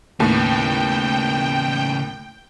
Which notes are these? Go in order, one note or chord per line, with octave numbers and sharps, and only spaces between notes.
D#2 A2 C#3 B3 G5